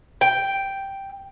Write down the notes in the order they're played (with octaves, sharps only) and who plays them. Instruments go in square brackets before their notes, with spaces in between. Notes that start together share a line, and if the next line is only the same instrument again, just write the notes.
[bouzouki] G5